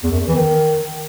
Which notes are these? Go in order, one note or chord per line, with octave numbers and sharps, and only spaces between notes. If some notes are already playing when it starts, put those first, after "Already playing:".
E2
F#2
E2
E3
D#3